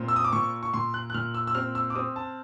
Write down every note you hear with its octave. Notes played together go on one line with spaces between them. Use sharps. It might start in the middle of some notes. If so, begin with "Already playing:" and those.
Already playing: A#2 C4
E6
D#6
D6
A#2 C#6
C#6
A#2 C6
F#6
F#6
A#2 F6
E6
E6
C4 F6
E6
D6
C4 D#6
A5